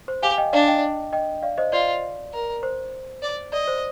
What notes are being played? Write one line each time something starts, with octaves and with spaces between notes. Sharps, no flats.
C5
G4 F5 G#5
D#5 G5
D4 D5 F5
D#5 G5
D#5 G5
D5 F5
C5 D#5
F4 D5
A#4
C5
D5
D5 D#5
C5